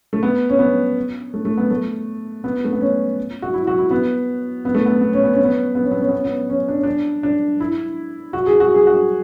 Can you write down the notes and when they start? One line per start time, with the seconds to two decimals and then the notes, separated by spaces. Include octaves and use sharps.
0.13 A3
0.23 B3
0.49 C#4
0.59 B3
1.34 A3
1.45 A3
1.58 B3
1.70 A3
2.44 B3
2.64 A3
2.73 B3
2.81 C#4
3.42 F#4
3.54 E4
3.67 F#4
3.78 E4
3.91 B3
4.65 B3
4.75 A3
4.86 B3
5.01 B3
5.13 C#4
5.24 B3
5.34 C#4
5.45 B3
5.75 B3
5.84 C#4
5.91 B3
6.01 C#4
6.09 B3
6.16 C#4
6.25 B3
6.50 C#4
6.68 D4
6.75 C#4
6.83 D4
7.23 D4
7.60 E4
8.33 F#4
8.46 G#4
8.60 F#4
8.74 G#4
8.87 F#4